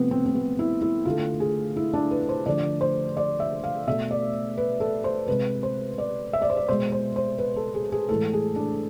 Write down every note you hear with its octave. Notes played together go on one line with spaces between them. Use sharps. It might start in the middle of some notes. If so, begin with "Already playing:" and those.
Already playing: C3 F3 A3 B3 C4
C4
C4
B3
E4
E4
D3 A3 F4
G#4
E4
D4
B4
C5
D3 F3 A3 D5
C5
D5
E5
F5
B2 A3 E5
D5
B4
A4
C5
C3 G#3 B4
C5
D5
E5
D5
C5
D5
B2 G#3 C5
C5
C5
B4
A4
G#4
G#4
A2 E3 G#3 A4
G#4
D4